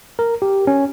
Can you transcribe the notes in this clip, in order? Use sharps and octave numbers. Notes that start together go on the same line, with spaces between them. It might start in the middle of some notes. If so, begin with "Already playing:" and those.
A#4
G4
C#4